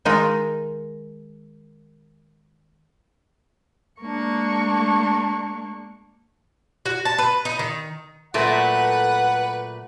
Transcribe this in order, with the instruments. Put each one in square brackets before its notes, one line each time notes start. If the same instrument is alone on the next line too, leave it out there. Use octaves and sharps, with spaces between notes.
[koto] D#3 G#3 D#4 F4 A#4
[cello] G#3 A#3 [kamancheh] D4 C#6
[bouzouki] F#4
A5
B4
D#4
D#3
[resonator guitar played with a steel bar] A#2 F#3 A3 [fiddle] B4 [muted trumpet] F#5